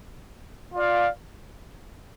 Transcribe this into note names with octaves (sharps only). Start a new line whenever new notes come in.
F4 D5 F5